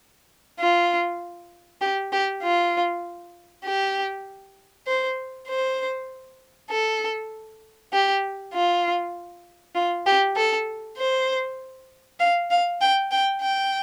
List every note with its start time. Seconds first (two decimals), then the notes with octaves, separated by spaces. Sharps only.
0.60 F4
1.81 G4
2.13 G4
2.43 F4
3.65 G4
4.87 C5
5.49 C5
6.70 A4
7.93 G4
8.53 F4
9.75 F4
10.06 G4
10.36 A4
10.98 C5
12.20 F5
12.51 F5
12.81 G5
13.11 G5
13.42 G5